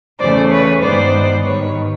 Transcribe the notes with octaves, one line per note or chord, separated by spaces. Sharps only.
E2 C#3 E3 A3 C5 D5
B4 C#5
G2 D#3 G#3 B3 C5 D5
G#2 D#3 G3 B4 C#5